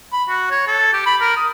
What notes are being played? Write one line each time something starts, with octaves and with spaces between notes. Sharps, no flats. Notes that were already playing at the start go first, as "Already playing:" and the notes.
B5
F#4
C#5
A4
G4
B5
A#4
D#6